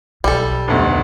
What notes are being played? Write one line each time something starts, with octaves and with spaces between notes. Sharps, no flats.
B1 G3 A4
F1 D2 B2